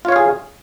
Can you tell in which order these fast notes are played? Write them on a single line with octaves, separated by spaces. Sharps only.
F4 C#5 F5 G#4